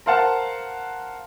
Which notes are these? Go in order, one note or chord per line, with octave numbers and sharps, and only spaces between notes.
A#4 C5 F5 F#5 A5